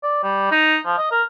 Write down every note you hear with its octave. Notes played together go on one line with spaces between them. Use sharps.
D5
G3
D#4
F3
D#5
A#4